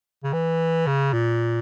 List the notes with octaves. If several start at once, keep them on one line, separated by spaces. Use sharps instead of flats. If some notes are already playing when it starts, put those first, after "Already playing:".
C#3
E3
C#3
A#2